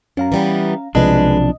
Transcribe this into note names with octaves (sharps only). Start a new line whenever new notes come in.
F#2 C#4 F5 A#5
E3 G3 B3
B1 C3 F3 G#3 D4 B4 D#5